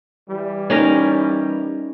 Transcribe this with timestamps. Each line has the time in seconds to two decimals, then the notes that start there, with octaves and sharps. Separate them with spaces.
0.29 E3 G3
0.70 C#4 D#4 A#4